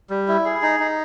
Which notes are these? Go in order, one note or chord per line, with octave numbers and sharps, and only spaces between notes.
G3
E4
G#4
D#4
D#4